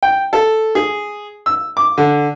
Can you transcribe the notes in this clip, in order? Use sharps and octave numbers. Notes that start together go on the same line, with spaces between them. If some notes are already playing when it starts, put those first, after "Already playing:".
G5
A4
G#4
E6
D6
D3